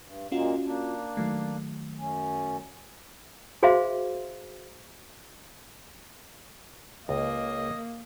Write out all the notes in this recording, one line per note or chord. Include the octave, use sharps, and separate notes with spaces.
G2
A#2 G#3 A#3 C#4 F4 F#4
A#3 D4
D#3 F#3 A3
F#2 C#4
F#4 G#4 C5 E5 F5 C6
C#2 A#3 D#5